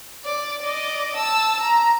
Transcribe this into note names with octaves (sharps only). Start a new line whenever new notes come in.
D5
D5 D#5
A5 E6
A#5